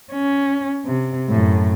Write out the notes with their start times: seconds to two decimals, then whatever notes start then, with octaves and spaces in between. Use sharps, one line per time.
0.12 C#4
0.86 C3
1.30 F#2 A2